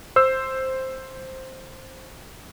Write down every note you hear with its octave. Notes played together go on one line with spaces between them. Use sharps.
C5 E6